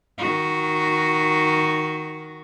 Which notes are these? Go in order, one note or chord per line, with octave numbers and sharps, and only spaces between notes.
D#3 F#4